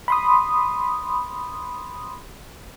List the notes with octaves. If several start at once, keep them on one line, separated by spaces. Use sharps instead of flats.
B5 C6 D#6